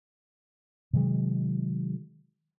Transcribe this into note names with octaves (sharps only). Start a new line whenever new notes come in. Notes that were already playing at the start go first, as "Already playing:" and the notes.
C3 D#3 F#3 G#3